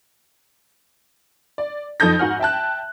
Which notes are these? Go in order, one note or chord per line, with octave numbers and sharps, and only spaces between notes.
D5
F2 D#4 A4 D#6 G6 A#6
G#2 F#4 F#5 G#5 F6
E5 G5 A5 F#6